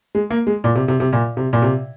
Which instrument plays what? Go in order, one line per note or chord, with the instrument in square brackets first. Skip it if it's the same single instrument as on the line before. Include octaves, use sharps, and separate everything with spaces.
[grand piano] G#3
A#3
G#3
A#2
C3
C3
C3
A#2
C3
A#2
C3